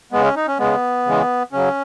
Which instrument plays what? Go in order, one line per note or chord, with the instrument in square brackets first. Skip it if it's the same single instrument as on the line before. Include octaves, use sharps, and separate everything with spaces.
[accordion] C#3 G#3 B3
C#4
D#4
C#4
C#3 G#3 B3
C#3 E3 G#3
C#3 F#3 C#4